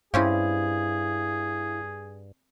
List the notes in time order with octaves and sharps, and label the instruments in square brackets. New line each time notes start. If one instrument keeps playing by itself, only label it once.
[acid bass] G2 [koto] C4 C#4 G4 [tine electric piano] E4 F5 [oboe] G#4